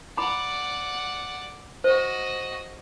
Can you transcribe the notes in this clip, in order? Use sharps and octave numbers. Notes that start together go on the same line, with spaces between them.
D5 F#5 A#5 B5 D6
F#4 C5 D#5